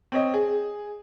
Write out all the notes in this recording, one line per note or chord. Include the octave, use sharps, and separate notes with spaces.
C4 C#5 D#5
G#4